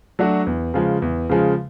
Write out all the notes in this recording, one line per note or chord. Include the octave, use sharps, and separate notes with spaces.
F#3 A3 D4 F#4
E2
C#3 F3 G#3
E2
C#3 F3 G#3